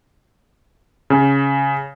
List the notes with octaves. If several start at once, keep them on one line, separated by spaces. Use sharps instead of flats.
C#3